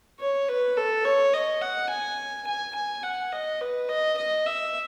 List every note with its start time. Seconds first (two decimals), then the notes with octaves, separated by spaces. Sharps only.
0.20 C#5
0.48 B4
0.77 A4
1.05 C#5
1.33 D#5
1.61 F#5
1.90 G#5
2.47 G#5
2.75 G#5
3.03 F#5
3.32 D#5
3.61 B4
3.89 D#5
4.18 D#5
4.46 E5